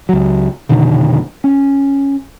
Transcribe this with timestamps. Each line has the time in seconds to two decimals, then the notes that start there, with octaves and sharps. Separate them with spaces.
0.09 C#2 F#3
0.69 F1 B2 D3 D#3
1.44 C#4